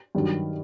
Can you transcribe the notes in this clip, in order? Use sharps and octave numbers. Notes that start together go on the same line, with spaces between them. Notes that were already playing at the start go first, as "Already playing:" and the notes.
G2 D#3 F#3